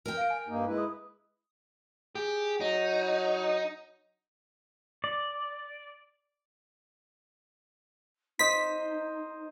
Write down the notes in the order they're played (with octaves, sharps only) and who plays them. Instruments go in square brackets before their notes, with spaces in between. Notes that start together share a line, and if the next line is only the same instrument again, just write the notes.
[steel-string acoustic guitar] A#4 G5
[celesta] F5 D7
G#5
[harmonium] G2 A#3 D#4
G#3 E4 B4
[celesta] D#6
[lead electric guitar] G4 [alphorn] G#4
[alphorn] F#3 [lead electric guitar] D#4
[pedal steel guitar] D5
[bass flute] D#4 [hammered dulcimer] C5 D#5 [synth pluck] B6